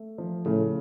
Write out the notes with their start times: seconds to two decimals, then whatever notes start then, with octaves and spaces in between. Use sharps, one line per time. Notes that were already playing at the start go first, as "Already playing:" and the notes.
Already playing: A3
0.18 F3
0.46 A2 C#3